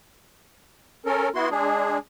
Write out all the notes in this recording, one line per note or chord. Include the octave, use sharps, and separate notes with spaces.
C#4 A4 A#4
B3 E4 F#4 C6
G#3 D4 G#4